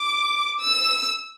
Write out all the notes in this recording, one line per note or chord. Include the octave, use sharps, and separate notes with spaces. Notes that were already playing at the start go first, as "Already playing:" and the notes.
Already playing: D6
E6